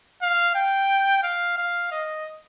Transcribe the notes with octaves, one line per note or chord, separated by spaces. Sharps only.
F5
G5
F5
F5
D#5